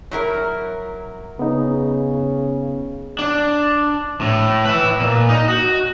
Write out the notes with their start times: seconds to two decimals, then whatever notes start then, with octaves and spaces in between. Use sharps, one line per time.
0.11 F#3 E4 A#4
1.39 C#3 B3 D#4
3.19 D4
4.21 A2
4.65 B4 E5
5.00 A#2
5.29 D#4
5.48 F#4